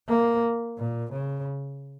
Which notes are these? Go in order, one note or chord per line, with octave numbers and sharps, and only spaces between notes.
A#3
A#2
C#3